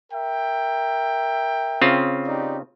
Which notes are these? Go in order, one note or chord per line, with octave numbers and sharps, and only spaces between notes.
A#4 E5 G5
C#3 C4 F4
D#4 G4 D5